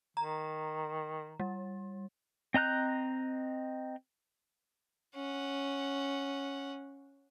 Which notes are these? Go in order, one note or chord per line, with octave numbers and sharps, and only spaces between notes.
D#3 A#5
G3
C4 D#5 A#5 F#6 G6
C#4 F#5